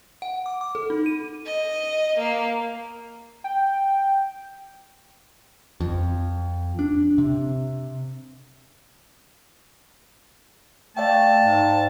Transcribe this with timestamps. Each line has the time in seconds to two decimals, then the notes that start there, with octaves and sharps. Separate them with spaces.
0.22 F#5
0.46 D6
0.61 D6
0.75 A4
0.90 D#4
1.06 D#7
1.46 D#5
2.19 A#3
3.44 G5
5.80 F2
6.79 D4
7.18 C3
10.97 A3 D5 F5 G5 A5
11.42 G#2